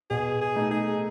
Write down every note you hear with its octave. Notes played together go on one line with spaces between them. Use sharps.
B2 G#4
G#4
A3 D#4
G#4